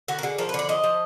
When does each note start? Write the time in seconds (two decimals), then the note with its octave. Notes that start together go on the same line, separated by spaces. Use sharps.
0.08 D3 F#4
0.18 A#4
0.23 D3 G#4
0.38 F3 A#4
0.49 B4
0.54 D3 D5
0.69 F3 D#5
0.84 F3